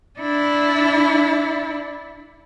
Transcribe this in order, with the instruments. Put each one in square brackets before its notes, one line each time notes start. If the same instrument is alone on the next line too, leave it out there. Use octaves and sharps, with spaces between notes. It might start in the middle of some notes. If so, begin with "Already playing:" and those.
[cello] D4 E4